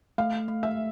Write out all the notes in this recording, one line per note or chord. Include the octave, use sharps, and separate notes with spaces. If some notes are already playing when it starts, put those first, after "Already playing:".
A3 F5
A3
E5